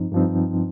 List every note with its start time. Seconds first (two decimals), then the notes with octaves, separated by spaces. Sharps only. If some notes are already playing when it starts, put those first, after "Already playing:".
Already playing: G2 F3 C4 D#4
0.12 G2 F3 C4 D#4